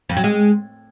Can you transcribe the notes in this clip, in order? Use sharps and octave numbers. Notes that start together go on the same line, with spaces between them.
F2
F#3
G#3